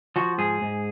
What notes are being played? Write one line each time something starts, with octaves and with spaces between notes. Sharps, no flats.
F3 F#4
G#2 G#4
G#2